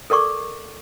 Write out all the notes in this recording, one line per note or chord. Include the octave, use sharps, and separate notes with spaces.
A4 A#4 D5 C#6 D6